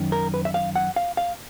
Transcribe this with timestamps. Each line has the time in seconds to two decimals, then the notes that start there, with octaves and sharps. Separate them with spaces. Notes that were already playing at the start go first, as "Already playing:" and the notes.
Already playing: F#2 D#3
0.12 A#4
0.34 B4
0.45 E5
0.54 F5
0.76 F#5
0.96 F5
1.17 F5